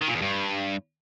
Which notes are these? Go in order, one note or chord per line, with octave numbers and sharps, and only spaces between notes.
D#3
A#2
E2
G2